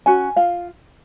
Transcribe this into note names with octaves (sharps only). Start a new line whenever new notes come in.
C#4 F#4 G#5
F4 F5